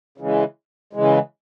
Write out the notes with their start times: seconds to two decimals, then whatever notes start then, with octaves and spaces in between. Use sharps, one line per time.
0.18 C#3 E3 G#3
0.93 C#3 E3 G#3